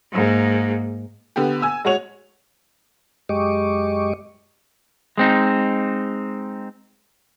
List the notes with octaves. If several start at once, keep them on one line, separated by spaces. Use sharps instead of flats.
G#2 A#3
D3 B3 G4
G#5 E6
G#3 F#4 C#5 F7
F#2 G#3 G4 D#5 C#6 D6
G#3 C4 D#4